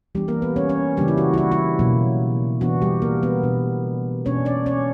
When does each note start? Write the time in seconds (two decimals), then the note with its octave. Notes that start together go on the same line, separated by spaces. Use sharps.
0.15 E3 G3 B3 D4 G4
0.28 A#3 A#4
0.42 B3 B4
0.56 C#4 C#5
0.69 C#4 C#5
0.97 C#3 E3 G3 A#3 D4 G4
1.08 E4
1.18 F#4
1.34 E4
1.38 F#4
1.52 E4
1.79 B2 F#3 A#3
2.61 E3 B3 D4 F#4
2.82 G3 G4
3.02 A#3 A#4
3.23 B3 B4
3.43 B2 A#3 D4
4.25 B2 A#3 C#4 D4 C#5
4.45 D4 D5
4.66 C#4 C#5